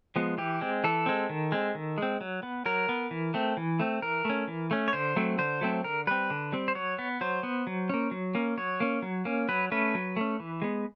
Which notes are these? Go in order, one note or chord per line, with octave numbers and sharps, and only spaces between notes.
F3 G#3 B3
E3 G4
G#3 C4
E3 A4
G#3 C4
D#3
G#3 C4
D#3
G#3 C4
F#3
B3
F#3 A#4
B3
E3
A3 C4
E3
A3 C4
E3 A#4
A3 C#4
E3
A3 C#4
C#5
D3 C5
F#3 A3 C4
D3 C5
F#3 A3 C4
D3 A#4
G3 C4 B4
D3
G3 C4
C5
F#3 C#5
B3
F#3 C5
B3
F#3
A#3 C#4
F#3
A#3 C#4
F#3 C#5
A#3 C#4
F#3
A#3 C#4
F#3 B4
A3 C#4 B4
F#3
A3 C#4
E3
G#3 B3